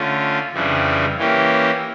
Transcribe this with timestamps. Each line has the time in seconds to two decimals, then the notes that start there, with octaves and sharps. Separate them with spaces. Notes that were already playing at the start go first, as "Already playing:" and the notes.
Already playing: D3 A3 C#4 F4
0.52 F2 C#3 E3 G3 D4
1.18 E3 A#3 C#4 G4